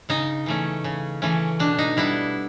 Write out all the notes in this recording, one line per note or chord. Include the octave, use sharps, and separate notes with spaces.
C#3 D#4
E3 A3 C#4
C#3
E3 A3 C#4
B2 D4
D#4
G3 B3 D4 E4